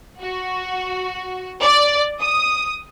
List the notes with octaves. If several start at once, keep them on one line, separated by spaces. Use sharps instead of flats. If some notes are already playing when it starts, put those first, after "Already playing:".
F#4
D5
D#6